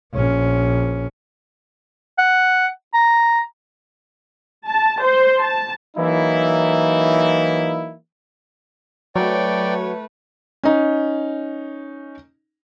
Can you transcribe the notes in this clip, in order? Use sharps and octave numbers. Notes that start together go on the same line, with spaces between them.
A#1 C#4
F#5
A#5
A5
C5
A5
E3 F#3 A#3 D#4 E4
F#3 A3 B4 C#5 D5 G5
C#4 D#4